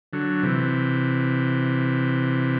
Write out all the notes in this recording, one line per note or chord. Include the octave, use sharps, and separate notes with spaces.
D3 F#3
C3 E3